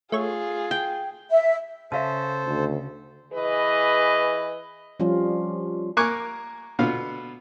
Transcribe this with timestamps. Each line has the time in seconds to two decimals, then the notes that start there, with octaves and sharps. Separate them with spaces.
0.12 A3 F4 G#4 C#5
0.71 G5
1.31 E5
1.92 C#3 A4 C5 E5 F5 A5
2.46 D2
3.33 E3 G#4 B4 D#5
5.00 F3 G3 C#4 F4
5.97 A#3 A#4 G#5 C#6 D6 F#6
6.79 B2 D3 B3 F4 F5